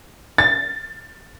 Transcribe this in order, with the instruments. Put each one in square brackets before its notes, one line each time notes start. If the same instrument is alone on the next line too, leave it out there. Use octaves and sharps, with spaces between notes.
[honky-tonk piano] A6